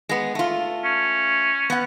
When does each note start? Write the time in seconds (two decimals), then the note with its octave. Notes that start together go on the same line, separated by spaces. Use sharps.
0.09 G#3 B3
0.35 A3 F4
0.84 C#4
1.70 B3 F#5